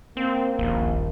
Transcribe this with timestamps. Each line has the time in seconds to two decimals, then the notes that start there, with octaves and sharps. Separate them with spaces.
0.17 A#3 C4
0.59 D#1 A#1